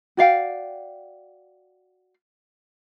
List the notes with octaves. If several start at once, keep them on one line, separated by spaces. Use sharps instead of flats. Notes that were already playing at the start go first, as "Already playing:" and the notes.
F#4 D5 F5 G5